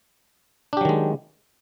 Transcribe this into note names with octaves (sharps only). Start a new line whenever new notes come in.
D#3 F#3 G#3 D4 G4